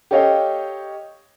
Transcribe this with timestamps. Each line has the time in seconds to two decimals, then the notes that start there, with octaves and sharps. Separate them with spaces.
0.11 G4 A4 C#5 D#5 F5 G5